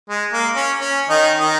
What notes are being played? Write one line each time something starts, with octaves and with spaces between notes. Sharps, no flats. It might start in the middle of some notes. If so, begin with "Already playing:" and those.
G#3
A#3
C#4
C#4
D#3 D#4
D#3 D#4